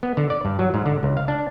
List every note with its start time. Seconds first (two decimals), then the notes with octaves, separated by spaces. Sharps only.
0.03 B3
0.17 D3
0.30 D5
0.45 G2
0.59 F#3
0.74 G#2
0.86 D3
1.03 C#2
1.17 F5
1.28 D4